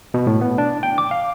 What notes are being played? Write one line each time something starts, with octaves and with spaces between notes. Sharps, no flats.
B2
A2
B3
D4
G5
D6
F5